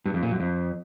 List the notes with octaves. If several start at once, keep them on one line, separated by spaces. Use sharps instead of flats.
G2
F2
A#2
F#2
F2